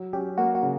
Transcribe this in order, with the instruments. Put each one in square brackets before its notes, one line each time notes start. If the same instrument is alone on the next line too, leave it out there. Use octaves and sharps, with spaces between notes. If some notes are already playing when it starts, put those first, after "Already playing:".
Already playing: [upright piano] F#3
[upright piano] C#4 [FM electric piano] G4
[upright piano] A#3 [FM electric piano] F#4
[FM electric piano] F#4
[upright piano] C#3